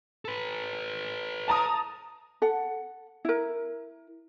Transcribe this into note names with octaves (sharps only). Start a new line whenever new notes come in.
A4 B4
A5 A#5 D#6
A4 F#5
E4 A#4